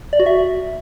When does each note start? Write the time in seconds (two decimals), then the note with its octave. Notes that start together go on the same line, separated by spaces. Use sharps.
0.13 D5
0.20 F#4
0.26 E5